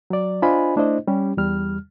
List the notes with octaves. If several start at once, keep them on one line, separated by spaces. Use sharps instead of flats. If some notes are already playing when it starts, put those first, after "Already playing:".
F#3 D5
D4 F4 C5 D#5 G#5 B5
A3 D4 E4 C5 D#5
G3 C#4 G4
E2 G3 F6